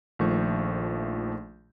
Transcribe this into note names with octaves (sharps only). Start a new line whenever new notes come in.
A#1 D#3 F3 A3 C#6 G6